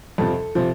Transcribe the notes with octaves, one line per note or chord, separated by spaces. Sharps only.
F2 C3 F3 A4
C3 F3